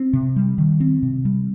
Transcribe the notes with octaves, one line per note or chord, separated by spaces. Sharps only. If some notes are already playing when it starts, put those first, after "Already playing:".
Already playing: C4
C3
G3
D#3
C4
C3
G3